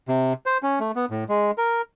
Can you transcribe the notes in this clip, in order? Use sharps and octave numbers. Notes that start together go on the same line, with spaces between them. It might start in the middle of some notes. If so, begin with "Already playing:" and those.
C3
C5
C#4
A3
B3
A2
G#3
A#4